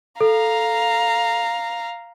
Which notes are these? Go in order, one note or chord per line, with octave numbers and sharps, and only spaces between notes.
A4 F5 A#5